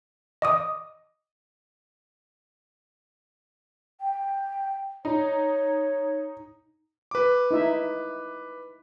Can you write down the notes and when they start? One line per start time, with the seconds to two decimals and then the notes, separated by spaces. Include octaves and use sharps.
0.42 D#5 D6 D#6
4.00 G5
5.05 D#4 C#5
7.11 B4 D6
7.51 D#4 E4 E5